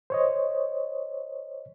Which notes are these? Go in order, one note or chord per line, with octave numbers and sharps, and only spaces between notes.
C5 C#5 D#5